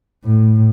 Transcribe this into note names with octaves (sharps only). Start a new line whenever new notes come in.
A2